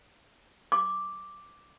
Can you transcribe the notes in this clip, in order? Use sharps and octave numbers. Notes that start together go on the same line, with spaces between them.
D6